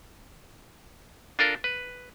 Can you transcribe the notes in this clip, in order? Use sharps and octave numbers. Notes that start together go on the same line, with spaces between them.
D4 F4 A4 A#4
B4